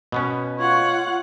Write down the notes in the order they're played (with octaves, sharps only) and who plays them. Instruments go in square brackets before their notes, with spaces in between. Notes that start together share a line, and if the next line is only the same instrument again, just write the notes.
[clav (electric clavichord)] B2 B3 C#4
[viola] F4 F#5 [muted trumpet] C#5